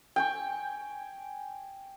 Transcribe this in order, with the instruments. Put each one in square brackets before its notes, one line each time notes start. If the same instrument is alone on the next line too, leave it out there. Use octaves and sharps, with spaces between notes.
[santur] G5 G#5 C#6